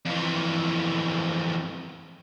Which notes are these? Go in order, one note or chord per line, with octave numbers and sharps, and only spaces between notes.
F2 E3